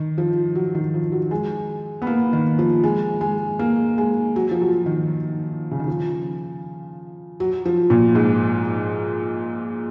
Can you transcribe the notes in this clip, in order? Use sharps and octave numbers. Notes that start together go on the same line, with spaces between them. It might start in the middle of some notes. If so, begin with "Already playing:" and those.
Already playing: D#3
F3
F#3
D#3
F3
F#3
G#3
B3
A#3
D#3
F3
G#3
G#3
A#3
G#3
F#3
F3
F#3
D#3
C#3
D#3
F3
F#3
F3
A#2
G#2